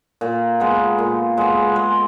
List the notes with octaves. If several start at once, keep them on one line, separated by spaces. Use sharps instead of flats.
A#2
G#3 B3
A#2
G#3 B3
G#3